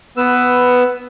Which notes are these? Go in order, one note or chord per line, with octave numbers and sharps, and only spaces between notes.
B3 B4 E6